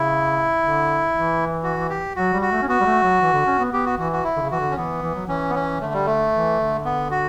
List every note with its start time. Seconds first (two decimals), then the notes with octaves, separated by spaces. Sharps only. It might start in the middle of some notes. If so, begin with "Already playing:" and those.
Already playing: C#3 E4
0.60 D3
1.12 E3
1.64 F#4
1.90 G4
2.16 F#3 F#4
2.33 G3
2.42 F#4
2.52 A3
2.62 C#4
2.68 B3 F#4
2.80 G3
2.86 A3
3.03 F#3
3.21 E3
3.33 D3
3.46 C#4
3.59 B3
3.72 B3 G4
3.85 F#4
3.98 E3 F#4
4.12 F#4
4.24 E4
4.36 D3
4.42 C#3
4.51 E3 F#4
4.60 D3
4.71 C#4
4.77 E3 B3
5.02 E3
5.15 F#3
5.27 E3 C#4
5.50 B3
5.55 C#4
5.81 D3 A3
5.94 G3
6.06 A3
6.34 E3
6.60 D3
6.85 B3
7.11 F#4